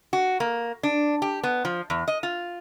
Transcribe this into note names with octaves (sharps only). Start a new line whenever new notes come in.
F#4
A#3
D4
G4
B3
F3
E2
D#5
F4